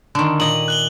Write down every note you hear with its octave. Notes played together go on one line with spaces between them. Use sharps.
D3 D#3
A#2 D#5 F#7
F#6 F#7 G7